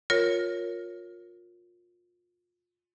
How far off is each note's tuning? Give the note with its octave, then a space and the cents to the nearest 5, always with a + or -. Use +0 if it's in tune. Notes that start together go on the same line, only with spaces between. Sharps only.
F4 +25 A#4 +0 C#5 +0